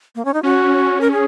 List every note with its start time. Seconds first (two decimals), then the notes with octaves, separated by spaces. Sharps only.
0.15 A#3
0.25 C#4
0.34 D#4
0.43 C#4 F#4
1.01 A#4
1.12 G#4